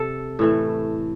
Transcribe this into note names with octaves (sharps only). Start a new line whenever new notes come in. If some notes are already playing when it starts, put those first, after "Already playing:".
Already playing: C3 A4
A2 E3 A3